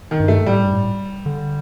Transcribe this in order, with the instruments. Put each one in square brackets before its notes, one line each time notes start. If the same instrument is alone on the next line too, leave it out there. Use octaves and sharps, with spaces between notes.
[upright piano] D#3
[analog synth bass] G2
[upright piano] A3
[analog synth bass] A2 [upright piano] G3
[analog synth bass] G2
A2
D3